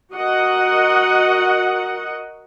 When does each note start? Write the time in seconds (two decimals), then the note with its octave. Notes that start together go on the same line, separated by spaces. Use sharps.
0.13 F#4 A#4 D#5 F#5